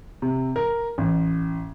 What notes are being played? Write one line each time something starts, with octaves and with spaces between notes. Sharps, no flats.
C3
A#4
A1